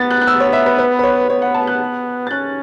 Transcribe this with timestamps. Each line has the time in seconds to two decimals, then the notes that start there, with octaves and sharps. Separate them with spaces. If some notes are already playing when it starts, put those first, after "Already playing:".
Already playing: B3 A6
0.11 F#6
0.21 F#6
0.27 E6
0.40 C#5
0.53 E5
0.66 B4
0.78 B4
0.99 B4
1.03 C#5
1.30 B3 C#5
1.42 F#5
1.54 A5
1.67 F#6
2.27 A6
2.31 C#4 F#6